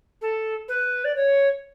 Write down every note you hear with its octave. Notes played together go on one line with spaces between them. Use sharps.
A4
B4
D5
C#5